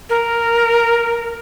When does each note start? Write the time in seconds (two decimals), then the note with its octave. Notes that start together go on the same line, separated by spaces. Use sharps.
0.10 A#4